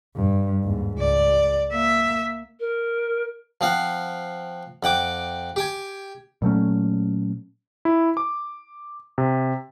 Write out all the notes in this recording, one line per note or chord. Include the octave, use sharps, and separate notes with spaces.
G2
D#2 G#2
C#2 D5
A#3 E5
A#4
F3 C4 F5 F#5
F2 F#5 G5 D6
G4 G5 G#5
A#2 F#3 A3 C#4
E4
D6
C3